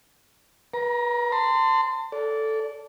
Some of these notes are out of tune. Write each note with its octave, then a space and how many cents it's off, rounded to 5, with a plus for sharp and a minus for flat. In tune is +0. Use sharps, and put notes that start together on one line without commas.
B4 -30 A#5 +25
A5 +35 C6 -20
A4 +0 D5 -25